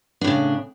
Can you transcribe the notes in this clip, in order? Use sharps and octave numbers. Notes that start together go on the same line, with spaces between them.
A2 C#3 D4